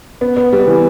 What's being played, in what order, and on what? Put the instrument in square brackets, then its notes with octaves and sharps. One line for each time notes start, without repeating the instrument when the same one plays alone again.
[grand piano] B3
B3
G3
E3